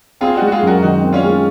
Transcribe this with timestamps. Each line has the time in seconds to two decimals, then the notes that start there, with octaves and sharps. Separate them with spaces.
0.21 C4 F4 G#4
0.37 D#4 F#4
0.42 G#3
0.47 F#4
0.52 F4 G#4
0.62 F#2
0.67 F#4 A#4
0.82 D#3 D#4 F#4
1.03 C4
1.13 C#4 F4
1.24 G#3